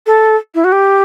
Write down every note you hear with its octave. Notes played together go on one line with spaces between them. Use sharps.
A4
E4
F#4
G4